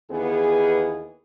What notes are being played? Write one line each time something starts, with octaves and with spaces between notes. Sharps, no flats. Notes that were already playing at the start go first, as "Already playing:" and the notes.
D#2 E3 B3 G#4